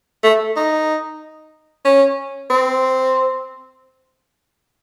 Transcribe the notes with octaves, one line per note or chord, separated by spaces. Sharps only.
A3
D#4
C#4
C4